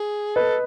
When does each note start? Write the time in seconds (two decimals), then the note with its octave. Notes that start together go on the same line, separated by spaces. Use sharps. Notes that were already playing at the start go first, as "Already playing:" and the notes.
Already playing: G#4
0.35 A4 B4 D#5